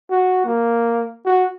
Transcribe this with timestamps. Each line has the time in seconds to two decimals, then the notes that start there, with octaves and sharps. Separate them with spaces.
0.11 F#4
0.45 A#3
1.25 F#4